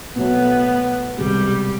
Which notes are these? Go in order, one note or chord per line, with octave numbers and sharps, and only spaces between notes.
B2 F#3 A3 B3
C2 B2 G3 G#3 B3